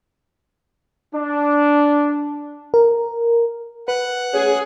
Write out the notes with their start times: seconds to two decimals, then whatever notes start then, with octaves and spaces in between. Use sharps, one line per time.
1.14 D4
2.74 A#4
3.88 B4 F#5 F#6
4.33 C#4 G#4